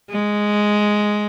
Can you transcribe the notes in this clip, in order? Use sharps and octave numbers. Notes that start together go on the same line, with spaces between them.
G#3